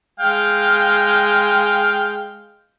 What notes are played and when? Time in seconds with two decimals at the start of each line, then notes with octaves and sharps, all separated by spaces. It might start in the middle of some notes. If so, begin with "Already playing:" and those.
0.20 G#3 F5 G5